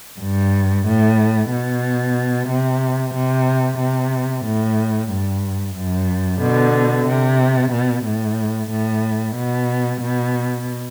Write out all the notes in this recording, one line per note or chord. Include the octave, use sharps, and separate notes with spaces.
G2
A2
B2
C3
C3
C3
A2
G2
F#2
B2 D3
C3
B2
A2
A2
B2
B2